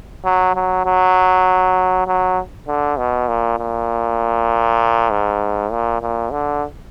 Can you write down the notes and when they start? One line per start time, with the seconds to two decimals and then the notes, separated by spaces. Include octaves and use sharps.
0.25 F#3
0.55 F#3
0.86 F#3
2.07 F#3
2.68 D3
2.98 B2
3.28 A#2
3.59 A#2
5.10 G#2
5.71 A#2
6.02 A#2
6.32 D3